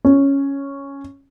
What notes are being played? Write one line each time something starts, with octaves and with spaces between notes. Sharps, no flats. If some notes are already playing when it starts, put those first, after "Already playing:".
C#4